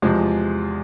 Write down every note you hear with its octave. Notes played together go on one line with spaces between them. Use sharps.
E2 C3 F3 G#3